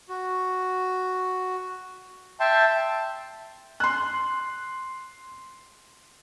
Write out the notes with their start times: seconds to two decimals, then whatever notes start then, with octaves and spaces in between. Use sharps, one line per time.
0.09 F#4
2.40 E5 G5 A5 C6
3.80 C6 F#6